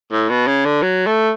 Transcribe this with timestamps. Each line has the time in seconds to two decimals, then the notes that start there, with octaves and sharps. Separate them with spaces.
0.12 A2
0.29 B2
0.47 C#3
0.65 D3
0.82 F#3
1.07 A3